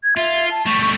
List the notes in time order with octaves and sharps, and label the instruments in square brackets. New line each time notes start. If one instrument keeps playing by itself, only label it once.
[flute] G#6
[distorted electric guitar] F4 [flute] E5
[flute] A5
[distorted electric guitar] G3 A3 [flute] C#6
[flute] C#6